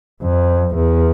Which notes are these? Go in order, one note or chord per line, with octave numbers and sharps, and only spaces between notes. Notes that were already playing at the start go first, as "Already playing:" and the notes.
F2
E2